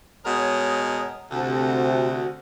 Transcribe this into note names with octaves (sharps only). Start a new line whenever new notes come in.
B2 G#3 A#4 C#5 D#6
D2 C3 F#4